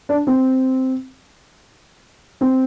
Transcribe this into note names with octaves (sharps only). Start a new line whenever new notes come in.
D4
C4
C4